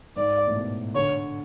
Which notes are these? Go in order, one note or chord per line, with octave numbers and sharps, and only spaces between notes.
G#2 D5
A2
B2
D3 C#5